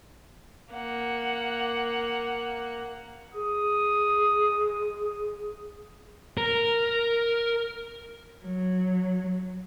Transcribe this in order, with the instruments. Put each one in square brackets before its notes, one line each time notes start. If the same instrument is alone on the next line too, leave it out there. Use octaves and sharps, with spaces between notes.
[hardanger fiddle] A#3 F#5
[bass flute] G#4 [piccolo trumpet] D#6
[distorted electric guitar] A#4
[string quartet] F#3